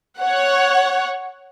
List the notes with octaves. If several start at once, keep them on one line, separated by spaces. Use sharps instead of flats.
C#5 F#5